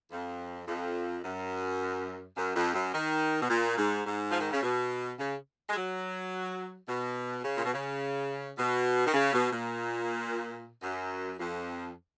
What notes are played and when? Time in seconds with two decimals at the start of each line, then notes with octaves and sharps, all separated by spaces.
0.11 F2
0.68 F2
1.24 F#2
2.37 F#2
2.56 F2
2.74 F#2
2.94 D#3
3.41 B2
3.50 A#2
3.78 G#2
4.06 G#2
4.30 F3
4.41 D#3
4.52 C#3
4.62 B2
5.19 C#3
5.69 G#3
5.75 F#3
6.88 B2
7.45 C#3
7.57 A#2
7.65 B2
7.73 C#3
8.58 B2
9.06 D#3
9.14 C#3
9.33 B2
9.52 A#2
10.83 F#2
11.39 F2